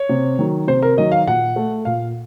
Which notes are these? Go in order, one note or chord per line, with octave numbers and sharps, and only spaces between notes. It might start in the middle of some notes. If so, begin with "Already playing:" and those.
Already playing: C#5
C3
D#3 F#3
C3 C5
A#4
D#3 F#3 D#5
F5
A#2 F#5
A3
A#2 F5